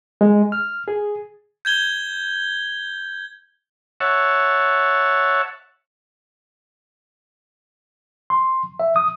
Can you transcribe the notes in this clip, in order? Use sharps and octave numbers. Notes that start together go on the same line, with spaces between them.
G#3
F6
G#4
G6 G#6 G7
C#5 E5 F#5 A5
C6
E5
D#6